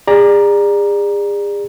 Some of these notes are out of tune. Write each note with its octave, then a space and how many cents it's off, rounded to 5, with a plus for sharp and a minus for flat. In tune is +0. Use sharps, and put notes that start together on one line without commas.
G#4 -35 D5 +10 A#5 +10